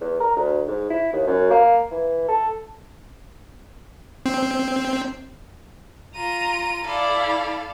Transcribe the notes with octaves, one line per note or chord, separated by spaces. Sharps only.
E2
A#4
D2
G#2
E4
D#2
F#2
A#3
E3
A4
C4
F4 A#5 D#7
E4 A4 D5 F5